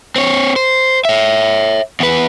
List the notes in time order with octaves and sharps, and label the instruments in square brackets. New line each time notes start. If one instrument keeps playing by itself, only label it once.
[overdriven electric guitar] C4 C#5
C5
C#5 E5
E2 B4